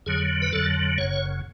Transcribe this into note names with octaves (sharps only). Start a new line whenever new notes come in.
F2 D3 F#3 G#4
B4
F2 D3 F#3 A4
F#1 F#2 C#3 C#5